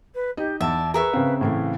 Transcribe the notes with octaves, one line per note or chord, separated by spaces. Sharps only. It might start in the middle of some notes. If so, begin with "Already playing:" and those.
B4
D#4 G4 D#5
E2 D5 E5 A5
G#4 A#4 B4 E5 C#6
C#3 C4 F5
A2 E3 A3 F5